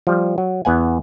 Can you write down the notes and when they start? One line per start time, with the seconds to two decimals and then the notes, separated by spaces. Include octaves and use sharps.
0.07 F3 G3
0.38 F#3
0.65 E2 B3 F#5 G#5